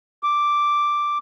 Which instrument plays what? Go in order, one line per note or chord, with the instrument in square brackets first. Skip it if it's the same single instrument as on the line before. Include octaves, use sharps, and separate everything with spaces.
[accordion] D6